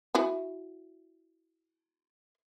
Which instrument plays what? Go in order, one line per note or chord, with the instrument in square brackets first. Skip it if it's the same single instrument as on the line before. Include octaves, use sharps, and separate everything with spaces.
[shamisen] E4 F#4 G#5